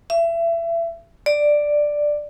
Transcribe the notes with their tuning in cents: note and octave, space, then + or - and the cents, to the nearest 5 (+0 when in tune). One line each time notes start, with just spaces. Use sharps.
E5 +30
D5 +5